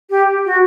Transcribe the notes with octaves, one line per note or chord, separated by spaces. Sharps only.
G4
F#4